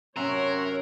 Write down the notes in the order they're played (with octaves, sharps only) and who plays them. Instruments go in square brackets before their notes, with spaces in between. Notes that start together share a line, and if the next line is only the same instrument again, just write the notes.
[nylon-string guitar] F#2 C3 C#4 [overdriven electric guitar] A#4 [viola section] C#5 [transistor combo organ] E5 F#5 C6